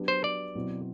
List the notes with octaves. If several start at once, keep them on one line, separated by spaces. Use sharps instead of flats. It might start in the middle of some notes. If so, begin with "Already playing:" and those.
Already playing: F#3 B3 D4 G4
C5
D5
B2 F#3 C4 E4